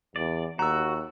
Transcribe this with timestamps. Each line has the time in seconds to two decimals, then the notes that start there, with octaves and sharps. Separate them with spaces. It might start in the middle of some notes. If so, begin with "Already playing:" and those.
0.16 E2 D5
0.59 D#2 F#4 A#5 E6